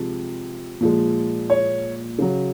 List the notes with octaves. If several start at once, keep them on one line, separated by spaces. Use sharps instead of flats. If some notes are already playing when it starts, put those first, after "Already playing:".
Already playing: C3 F3 G#3
A#2 F3 G#3
C#5
C#3 F#3